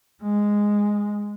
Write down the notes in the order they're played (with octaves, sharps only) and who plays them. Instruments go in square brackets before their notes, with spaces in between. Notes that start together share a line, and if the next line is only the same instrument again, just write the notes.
[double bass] G#3